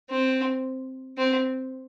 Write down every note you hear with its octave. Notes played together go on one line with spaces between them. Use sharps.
C4
C4